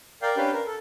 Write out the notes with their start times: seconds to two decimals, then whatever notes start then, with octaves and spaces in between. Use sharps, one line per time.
0.22 A#4 D5 F5 G5
0.37 C#4 D4 G4 B4 F5 G5
0.53 A#4
0.66 A4